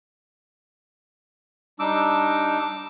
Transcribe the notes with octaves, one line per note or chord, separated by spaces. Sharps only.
G3 D4 D#4 D6 E6